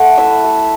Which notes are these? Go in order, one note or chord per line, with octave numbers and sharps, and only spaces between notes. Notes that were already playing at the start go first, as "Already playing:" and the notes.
Already playing: A3 F#5
E4 E5
A3